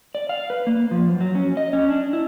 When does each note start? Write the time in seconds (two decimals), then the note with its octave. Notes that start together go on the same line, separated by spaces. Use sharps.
0.15 D5
0.29 F5
0.50 B4
0.67 A#3
0.91 F3
1.09 F#2
1.21 F#3
1.35 C#4
1.57 D#5
1.73 C#4
1.89 D4
2.13 E4